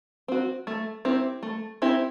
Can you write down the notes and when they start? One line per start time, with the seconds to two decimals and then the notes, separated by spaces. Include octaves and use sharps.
0.28 C4 F#4
0.67 A3
1.05 C4 E4 G4
1.43 A3
1.82 C4 E4 G4